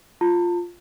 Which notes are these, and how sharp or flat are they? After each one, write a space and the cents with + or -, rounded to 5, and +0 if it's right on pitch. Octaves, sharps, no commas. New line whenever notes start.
F4 +0 A5 +35